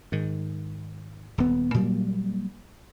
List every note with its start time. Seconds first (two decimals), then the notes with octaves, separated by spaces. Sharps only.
0.12 G#2 D#3
1.38 D#1 B3
1.74 A#2 F#3 G3 A#3